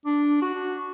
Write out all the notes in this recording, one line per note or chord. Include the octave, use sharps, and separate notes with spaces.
D4
F#4